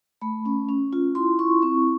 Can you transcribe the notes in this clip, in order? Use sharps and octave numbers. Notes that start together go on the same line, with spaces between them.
A3 B5
C#4
C#4
F4
E4 C6
E4 C#6
C4 C#6